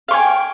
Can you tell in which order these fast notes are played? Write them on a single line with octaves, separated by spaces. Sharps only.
F5 C#6 G#5 G5